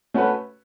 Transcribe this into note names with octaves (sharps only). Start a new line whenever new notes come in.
A3 C#4 F#4 B4